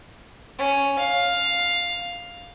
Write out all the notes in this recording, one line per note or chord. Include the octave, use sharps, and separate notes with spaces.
C#4
F5